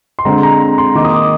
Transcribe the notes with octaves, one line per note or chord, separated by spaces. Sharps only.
C6
D3 G#3 C4 A#5
A#5
C6
D#3 A#3 D#4 D6
D#6
D6